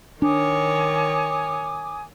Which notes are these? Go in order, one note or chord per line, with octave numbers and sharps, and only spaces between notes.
D#3 D4 C#5 G#5 D6 D#6